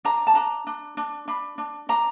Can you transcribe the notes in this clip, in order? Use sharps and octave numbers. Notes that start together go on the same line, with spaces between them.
D4 A#5
A5
D4 A#5
D4
D4
D4 B5
D4
D4 A#5